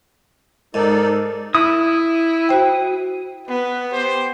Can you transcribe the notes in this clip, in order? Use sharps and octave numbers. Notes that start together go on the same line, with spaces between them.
G#2 D#4 A4 A#4 D5
E4 D#6
F#4 C5 G5
B3 B4
G4 C5